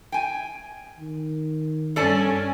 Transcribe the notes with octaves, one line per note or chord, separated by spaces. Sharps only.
G5 G#5
D#3
G2 C#4 A4 D5 A5